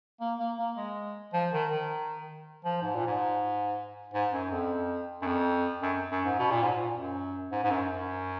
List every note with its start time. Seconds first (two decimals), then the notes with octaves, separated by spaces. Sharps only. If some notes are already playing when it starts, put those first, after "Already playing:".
0.21 A#3
0.39 A#3
0.58 A#3
0.77 G#3
1.33 F3
1.52 D#3
1.71 D#3
2.65 F3
2.82 G#2
2.95 A#2
3.07 G#2
4.14 G#2
4.33 F#2
4.51 F2
5.22 F#2
5.27 F2
5.82 F#2
6.11 F#2
6.25 G#2
6.39 B2
6.51 A#2
6.63 G#2
6.75 A#2
6.95 F#2
7.52 G#2
7.64 G#2
7.71 F#2
7.89 F#2